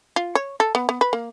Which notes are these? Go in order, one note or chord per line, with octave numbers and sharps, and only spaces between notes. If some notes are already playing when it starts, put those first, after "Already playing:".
F4
C#5
A4
B3
B3
B4
A#3